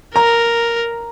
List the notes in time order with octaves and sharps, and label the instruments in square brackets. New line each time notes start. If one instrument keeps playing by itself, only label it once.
[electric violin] A#4 [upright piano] A#5